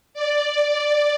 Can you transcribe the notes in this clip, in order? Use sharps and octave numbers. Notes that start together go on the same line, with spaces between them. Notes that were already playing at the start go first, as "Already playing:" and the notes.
D5